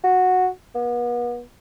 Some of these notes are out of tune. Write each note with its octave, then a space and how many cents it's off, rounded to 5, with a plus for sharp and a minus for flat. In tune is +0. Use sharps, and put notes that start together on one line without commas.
F#4 -10
B3 -40